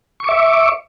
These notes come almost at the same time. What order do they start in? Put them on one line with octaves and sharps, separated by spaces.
C#6 D6 E5